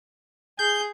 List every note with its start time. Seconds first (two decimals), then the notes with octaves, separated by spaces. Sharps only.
0.59 G#4 G6